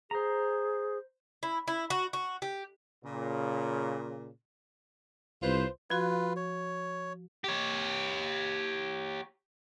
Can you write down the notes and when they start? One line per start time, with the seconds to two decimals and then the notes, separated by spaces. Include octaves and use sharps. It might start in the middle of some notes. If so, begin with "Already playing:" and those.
0.11 G#4 C5 A#5
1.43 E4
1.68 E4
1.90 F#4
2.13 F#4
2.42 G4
3.04 A#2 C#3
5.42 C2 F4 B4 C5
5.90 F3 F4 F#4 B4
6.36 C#5
7.44 G4 C#5